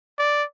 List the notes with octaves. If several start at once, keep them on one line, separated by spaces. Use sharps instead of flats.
D5